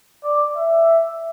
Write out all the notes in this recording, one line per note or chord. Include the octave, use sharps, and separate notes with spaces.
D5
E5